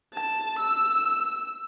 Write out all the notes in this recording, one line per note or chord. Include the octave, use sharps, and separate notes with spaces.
A5
E6